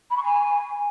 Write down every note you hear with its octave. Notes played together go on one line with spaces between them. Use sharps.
B5
C#6
G#5